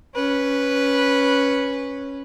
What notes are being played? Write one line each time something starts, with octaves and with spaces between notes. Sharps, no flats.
C#4 B4